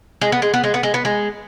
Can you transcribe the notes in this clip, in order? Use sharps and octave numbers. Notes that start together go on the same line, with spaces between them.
G#3
B3
G#3
B3
G#3
B3
G#3
B3
G#3